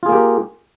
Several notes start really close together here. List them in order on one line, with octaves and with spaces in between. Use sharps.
F4 G#4 A#3 G4 A#4